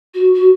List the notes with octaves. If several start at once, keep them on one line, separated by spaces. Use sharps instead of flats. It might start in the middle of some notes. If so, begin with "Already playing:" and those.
F#4
F#4